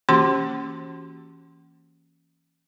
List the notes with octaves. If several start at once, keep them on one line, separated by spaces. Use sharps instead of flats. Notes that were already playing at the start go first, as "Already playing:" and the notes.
E3 A#3 C#4 F#4 G4 C6